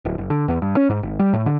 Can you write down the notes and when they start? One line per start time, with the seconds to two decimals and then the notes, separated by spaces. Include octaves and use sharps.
0.05 D1
0.18 F#1
0.30 D3
0.48 E2
0.62 G2
0.77 C#4
0.89 G#2
1.03 G#1
1.19 G3
1.33 A2
1.46 D3